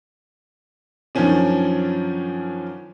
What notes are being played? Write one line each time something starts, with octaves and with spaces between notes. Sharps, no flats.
F#2 D#3 F3 C#4 D4